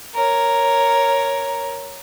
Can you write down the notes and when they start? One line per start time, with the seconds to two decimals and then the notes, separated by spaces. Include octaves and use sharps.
0.15 A#4 C#5